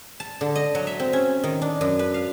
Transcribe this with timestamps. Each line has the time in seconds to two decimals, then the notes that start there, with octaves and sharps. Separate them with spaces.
0.20 A5
0.41 D3
0.55 D#5
0.75 F#3
0.87 E5
1.00 C4
1.13 C#4
1.44 D#3
1.62 D4
1.81 F#2
1.99 B4
2.14 F5